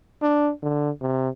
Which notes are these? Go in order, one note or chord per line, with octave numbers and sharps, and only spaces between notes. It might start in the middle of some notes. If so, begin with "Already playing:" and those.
D4
D3
C3